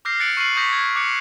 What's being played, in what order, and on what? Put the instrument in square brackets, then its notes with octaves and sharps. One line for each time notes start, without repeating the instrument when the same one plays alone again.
[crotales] D6 E6 F6 G6 A#6 C7
F6 F#6 A6 C#7 D7 F#7
C#6 F6 C7 C#7 D#7 F#7
C#6 D#6 G6 A#6 B6
G#6
D6 F#6 C#7